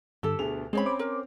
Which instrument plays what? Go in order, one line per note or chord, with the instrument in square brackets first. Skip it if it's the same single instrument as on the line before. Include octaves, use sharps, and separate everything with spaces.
[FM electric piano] G2 D3 [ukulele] G4 A4 [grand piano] E6
[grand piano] D2 B2 F7 [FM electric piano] G#4
[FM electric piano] G#3 [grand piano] C4 C#4 [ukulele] G#4 C#5 B5
[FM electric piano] C5 D6
[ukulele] A#4